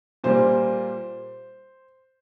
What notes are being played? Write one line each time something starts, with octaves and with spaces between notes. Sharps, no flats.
A#2 G3 A#3 C5